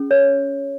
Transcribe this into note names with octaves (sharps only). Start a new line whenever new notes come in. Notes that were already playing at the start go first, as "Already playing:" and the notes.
Already playing: C#4 G#4
C#5